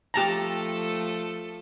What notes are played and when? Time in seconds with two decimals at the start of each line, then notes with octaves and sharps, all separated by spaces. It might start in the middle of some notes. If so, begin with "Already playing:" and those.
0.14 F3 A3 G4 A4 A5 A#5